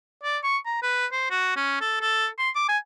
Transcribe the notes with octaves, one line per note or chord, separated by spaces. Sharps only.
D5
C#6
A#5
B4
C5
F#4
C#4
A4
A4
C6
D6
G#5